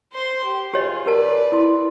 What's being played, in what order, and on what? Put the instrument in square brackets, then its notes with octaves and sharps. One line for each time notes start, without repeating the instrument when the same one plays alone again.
[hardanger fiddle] C5 C6
G4
[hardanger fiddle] F4 G#4 [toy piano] G4 C#5 D#5
[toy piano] G4 A#4 A5 [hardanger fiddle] B4 D5
[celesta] E4 C6